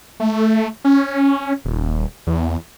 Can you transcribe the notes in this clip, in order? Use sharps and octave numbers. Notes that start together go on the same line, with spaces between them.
A3
C#4
D#1
E2